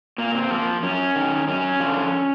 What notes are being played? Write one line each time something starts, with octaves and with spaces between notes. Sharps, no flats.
A#2 A#3
C4
F3 A#3
F#2 C#4
D#3
F#2 C#4
D3 F3